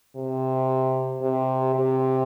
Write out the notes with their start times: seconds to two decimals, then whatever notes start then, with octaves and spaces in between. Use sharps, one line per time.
0.16 C3
1.22 C3
1.75 C3